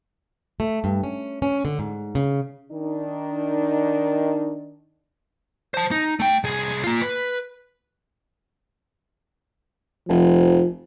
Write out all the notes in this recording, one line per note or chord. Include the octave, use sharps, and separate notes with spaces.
A3
G2
C#4
C#4
D3
G#2
C#3
D#3 D4 D#4
C5 A5
D#4
A3 G5
C2 G#4
A#3 F4
B4
F1 F3